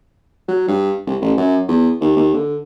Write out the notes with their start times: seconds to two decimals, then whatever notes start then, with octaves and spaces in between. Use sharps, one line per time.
0.48 F#3
0.68 G2
1.07 C2
1.21 A1
1.37 F#2
1.68 E2
2.01 D#2
2.17 D#2
2.34 D3